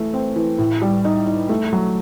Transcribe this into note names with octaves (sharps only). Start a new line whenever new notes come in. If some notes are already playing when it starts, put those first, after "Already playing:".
Already playing: E3 A3
C4
E3
A2
G3
D#4
D#4
A3
F#3